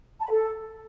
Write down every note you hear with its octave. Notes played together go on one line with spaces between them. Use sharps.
A5
B5
A4